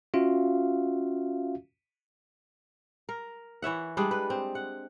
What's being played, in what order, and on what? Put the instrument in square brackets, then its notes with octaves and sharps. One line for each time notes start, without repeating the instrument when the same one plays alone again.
[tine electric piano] C#4 F4 F#4 E5 F5
[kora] A#4
E3 C#5 E5 F#5
G3 G#3 D4 G#4
B4
C4
F#5